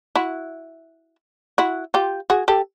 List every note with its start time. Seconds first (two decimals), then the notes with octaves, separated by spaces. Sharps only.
0.15 E4 F#4
1.58 E4 F#4
1.94 F4 G4
2.30 F#4 G#4
2.48 G4 A4